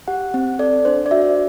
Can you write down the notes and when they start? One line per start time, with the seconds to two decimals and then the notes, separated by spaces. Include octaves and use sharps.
0.08 G4 F#5
0.34 C4
0.59 A4 D5
0.85 D4 C5
1.06 D5
1.11 F#4 E5